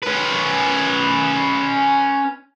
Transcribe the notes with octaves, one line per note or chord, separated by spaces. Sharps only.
C#4 B4